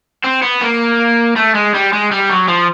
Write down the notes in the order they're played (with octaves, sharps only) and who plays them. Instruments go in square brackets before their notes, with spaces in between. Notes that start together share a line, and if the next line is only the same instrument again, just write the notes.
[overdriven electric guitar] C4
B3
A#3
A3
G#3
G3
G#3
G3
F#3
F3